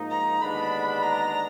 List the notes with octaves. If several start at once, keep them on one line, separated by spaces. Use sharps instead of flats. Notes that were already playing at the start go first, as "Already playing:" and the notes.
Already playing: G#2 F3 A#3 D#4
A#5
D#2 D3 G#3 B3 D4 B5
A#5